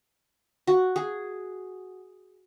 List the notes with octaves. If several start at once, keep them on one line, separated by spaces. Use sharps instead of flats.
F#4
G#4